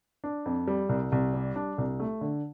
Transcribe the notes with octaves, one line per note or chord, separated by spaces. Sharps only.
D4
F2
G3
C2
C2
G3
D4
C2
A3
D3